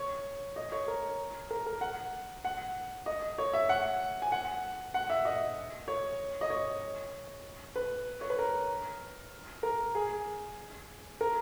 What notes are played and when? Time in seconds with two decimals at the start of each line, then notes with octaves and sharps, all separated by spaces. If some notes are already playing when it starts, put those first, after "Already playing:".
Already playing: C#5
0.56 D#5
0.72 C#5
0.88 A#4
1.51 A#4
1.66 A#4
1.81 F#5
2.45 F#5
3.06 D#5
3.38 C#5
3.53 E5
3.69 F#5
4.22 G#5
4.32 F#5
4.94 F#5
5.10 E5
5.25 D#5
5.88 C#5
6.41 D#5
6.50 C#5
7.76 B4
8.21 C#5
8.30 B4
8.39 A#4
9.63 A#4
9.95 G#4
11.21 A#4